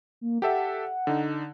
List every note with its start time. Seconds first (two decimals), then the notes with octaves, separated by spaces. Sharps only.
0.21 A#3
0.42 G4 A4 E5 F#5
1.07 D3 D#4